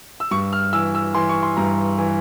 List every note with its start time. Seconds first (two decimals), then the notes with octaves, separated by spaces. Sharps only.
0.20 E6
0.31 G2 C#6
0.53 F6
0.73 E3 E6
0.95 E6
1.14 E3 C6
1.29 C#6
1.43 C6
1.57 G2 A#5
1.98 E3